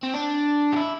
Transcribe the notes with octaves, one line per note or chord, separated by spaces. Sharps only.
C4
D4
G4
E4